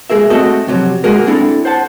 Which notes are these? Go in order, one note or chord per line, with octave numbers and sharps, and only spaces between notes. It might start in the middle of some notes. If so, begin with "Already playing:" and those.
G#3 A#3 G#4 A#4 E5
A3 C4 F#4 A4 D#5
F2 C3 F#3
G#3 A#3 F#4 G#4 A#4
C4 D4 E4 A4
C5 F#5 A5